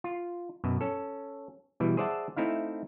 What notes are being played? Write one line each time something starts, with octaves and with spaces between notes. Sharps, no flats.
F4
F#2 B2
C#4 A4
B2 E3 G3
G#4 C5 D5 E5 F#5 A5
A3 C4 D#4 E4 F5